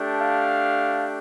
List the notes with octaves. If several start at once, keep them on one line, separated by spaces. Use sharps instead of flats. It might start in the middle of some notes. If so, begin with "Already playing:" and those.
Already playing: A3 D4 G4
F5